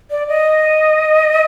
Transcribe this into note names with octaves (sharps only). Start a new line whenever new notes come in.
D5
D#5